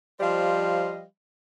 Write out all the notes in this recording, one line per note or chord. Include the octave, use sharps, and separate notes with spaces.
F3 G3 C5 D#5 F5